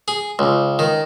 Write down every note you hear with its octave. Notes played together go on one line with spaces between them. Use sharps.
G#4
C#2
D#3